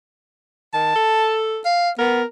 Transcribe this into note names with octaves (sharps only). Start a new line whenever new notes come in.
D#3 A5
A4
F5
B3 A#4